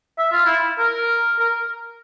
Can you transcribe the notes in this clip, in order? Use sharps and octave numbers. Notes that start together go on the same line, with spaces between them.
E5
F4
E4
A#4
A#4